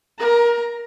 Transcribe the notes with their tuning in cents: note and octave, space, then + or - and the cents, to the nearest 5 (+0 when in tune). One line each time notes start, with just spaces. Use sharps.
A#4 +20 A#5 +0